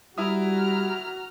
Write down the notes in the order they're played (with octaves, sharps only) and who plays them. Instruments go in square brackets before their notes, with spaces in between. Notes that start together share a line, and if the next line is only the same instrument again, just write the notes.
[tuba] G3 [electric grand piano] E4 E5 D#6 [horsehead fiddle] F#4 [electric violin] A#5 F6